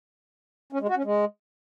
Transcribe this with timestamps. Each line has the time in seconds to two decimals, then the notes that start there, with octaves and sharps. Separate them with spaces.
0.73 C#4
0.81 G#3
0.89 F#4
0.97 C#4
1.05 G#3